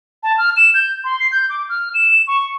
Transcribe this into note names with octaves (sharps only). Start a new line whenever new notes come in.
A5
F6
E7
G6
C6
C7
G6
D6
F6
E7
C#6